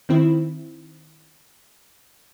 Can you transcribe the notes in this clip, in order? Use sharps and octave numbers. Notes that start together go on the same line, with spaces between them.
D#3 C4 E4